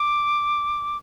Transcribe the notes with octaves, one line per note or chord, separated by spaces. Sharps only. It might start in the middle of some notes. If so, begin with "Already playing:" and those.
Already playing: D6